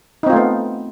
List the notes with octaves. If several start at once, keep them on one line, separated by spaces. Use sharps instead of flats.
A3 B3 C4 D#4 F4